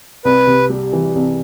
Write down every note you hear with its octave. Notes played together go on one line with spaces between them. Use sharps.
C2 B4
C3
G3
E3
C2